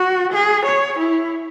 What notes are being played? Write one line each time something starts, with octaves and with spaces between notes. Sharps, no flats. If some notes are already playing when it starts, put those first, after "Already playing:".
Already playing: F#4
G#4
C#5
E4